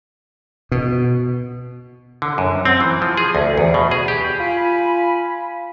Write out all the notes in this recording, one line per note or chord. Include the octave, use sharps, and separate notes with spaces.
B2
D3
F#2
C4
E3
F3
G#4
D2
E2
B2
G#4
G4
F4 G#5 B5